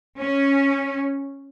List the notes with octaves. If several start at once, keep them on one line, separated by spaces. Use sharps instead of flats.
C#4